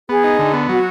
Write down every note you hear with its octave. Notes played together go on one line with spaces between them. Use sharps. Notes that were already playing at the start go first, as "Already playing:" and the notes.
B3 G#4
D#4
D3
B3
F#3 F#4